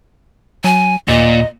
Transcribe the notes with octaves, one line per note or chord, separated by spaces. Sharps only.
F#3 G#5
D#2 A#2 D#5